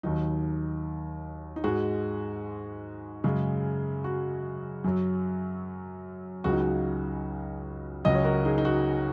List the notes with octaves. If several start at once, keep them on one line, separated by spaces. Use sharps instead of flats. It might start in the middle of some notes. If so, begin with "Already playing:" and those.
D#2 D#3 F#3 D#4
D#4
G#2 G#3 F#4
F#2 C#3 G#3
F#4
F#2 F#3
C#2 C#3 F#3 F#4
D#4
F#4
C#2 C#3 F#3 D#5
C#5
F#4 A#4
D#4 G#4
D#4
F#4